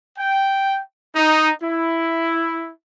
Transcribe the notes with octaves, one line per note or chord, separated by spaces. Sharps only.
G5
D#4
E4